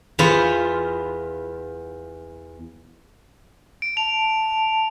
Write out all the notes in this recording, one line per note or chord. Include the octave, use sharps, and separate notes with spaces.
E2 B3 F4
D7
A5 F7